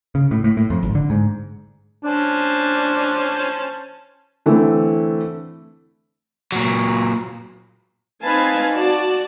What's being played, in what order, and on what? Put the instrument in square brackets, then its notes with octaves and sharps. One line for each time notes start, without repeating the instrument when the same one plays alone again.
[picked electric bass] C#3
A2
A2
A2
F2
G#1
D3
G#2
[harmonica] C#4 C5 A5 [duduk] D4
[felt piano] D3 E3 A3 C4
[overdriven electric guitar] A#2 F#3
[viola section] C4 D#4 B4 F5 G#5 A5
F#4 D5 A5